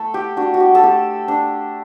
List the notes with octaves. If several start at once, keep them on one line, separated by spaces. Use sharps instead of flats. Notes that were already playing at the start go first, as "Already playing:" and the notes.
Already playing: A3 A4
G4
D4 F#4
F#4
G4
A4
A3 G4
D4